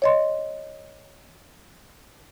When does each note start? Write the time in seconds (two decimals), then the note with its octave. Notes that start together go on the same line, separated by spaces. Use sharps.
0.02 C#5 D#5 C6